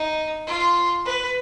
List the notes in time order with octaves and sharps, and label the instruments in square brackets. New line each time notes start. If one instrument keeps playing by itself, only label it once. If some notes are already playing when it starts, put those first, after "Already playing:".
Already playing: [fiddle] D#4
F4
B4